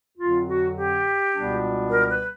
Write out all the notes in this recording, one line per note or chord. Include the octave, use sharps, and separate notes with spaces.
F2 D3 F#3 F4
F#4
G4
C#2 B2 G3 B3 D4
A#4
B4